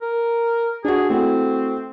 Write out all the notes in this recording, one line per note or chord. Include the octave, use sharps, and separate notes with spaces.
A#4
D4 F#4 G#4
A3 C4 E4 F#4